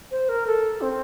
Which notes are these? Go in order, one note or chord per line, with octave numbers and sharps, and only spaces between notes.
C5
A#4
A4
C4